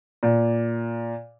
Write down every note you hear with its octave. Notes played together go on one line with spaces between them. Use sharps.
A#2